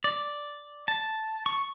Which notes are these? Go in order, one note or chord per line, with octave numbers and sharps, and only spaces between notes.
D5
A5
C#6